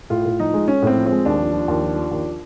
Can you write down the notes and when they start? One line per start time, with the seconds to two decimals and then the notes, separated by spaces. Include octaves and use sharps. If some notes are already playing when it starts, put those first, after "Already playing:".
0.10 A2 F4
0.25 A2
0.40 F3 D#4
0.54 G#3
0.68 G#3 C#4
0.83 A2 C4
0.96 F3
1.06 C4
1.11 G#3
1.25 D#2 D4
1.39 F3
1.53 F3
1.68 D#2
1.82 F3
1.96 F3
2.11 D#2